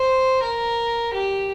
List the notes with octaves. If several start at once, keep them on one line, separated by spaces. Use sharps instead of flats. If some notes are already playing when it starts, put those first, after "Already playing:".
Already playing: C5
A#4
G4